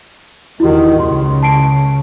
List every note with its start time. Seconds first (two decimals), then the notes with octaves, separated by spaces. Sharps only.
0.60 E2 D#3 E4 F#4 G4
1.00 C#2 C#3 C6
1.43 A5 C7 D7